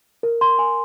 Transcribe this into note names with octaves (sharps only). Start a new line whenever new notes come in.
A#4
C6
G#5